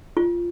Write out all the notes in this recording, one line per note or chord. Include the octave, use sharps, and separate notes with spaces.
F4